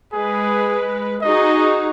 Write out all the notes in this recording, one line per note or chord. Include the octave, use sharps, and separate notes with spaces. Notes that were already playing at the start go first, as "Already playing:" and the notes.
G#3 G#4 B4
D#4 F#4 G#4 D#5